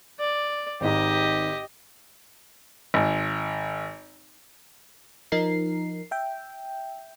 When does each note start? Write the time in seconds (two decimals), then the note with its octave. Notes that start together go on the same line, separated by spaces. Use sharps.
0.20 D5
0.81 G#1 G#2 G4 D#5
2.94 G#1
5.32 F3 D#4 A#4 C7
6.11 E5 G5